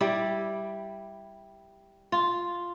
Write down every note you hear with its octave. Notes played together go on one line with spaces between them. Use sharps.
G3 E4 D5
F4